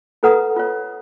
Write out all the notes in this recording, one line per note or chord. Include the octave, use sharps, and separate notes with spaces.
F4 A4 B4 F#5 A#5 D#6
F4 C#5